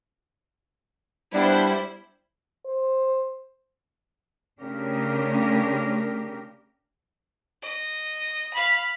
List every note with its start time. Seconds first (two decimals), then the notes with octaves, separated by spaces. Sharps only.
1.34 G3 B3 D4 E4 C5
2.66 C5
4.60 C#3 A3 C#4 D4 G4 A#4
7.62 D#5
8.53 F5 B5